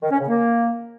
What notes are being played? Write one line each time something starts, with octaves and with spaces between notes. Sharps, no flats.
D#3
C#4
C#3
A#3